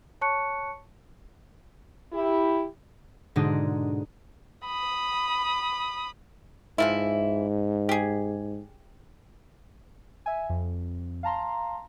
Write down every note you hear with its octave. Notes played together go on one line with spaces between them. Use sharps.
C#5 A5 C#6 F#6 C#7
E4 G4
G#2 B2 D3 G#3 D4 D#4
B5 D#6
G#2 E3 F3 E4
G4 G#4
E5 G#5
F2
F5 A5 A#5 C6